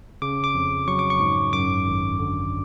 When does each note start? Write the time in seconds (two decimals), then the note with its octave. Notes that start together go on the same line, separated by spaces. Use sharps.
0.22 C#3 D6
0.44 D6
0.54 F2
0.87 F#3 C#6
0.99 D6
1.10 C#6
1.20 G#2
1.53 F#2 D6
1.86 G#1
2.19 D3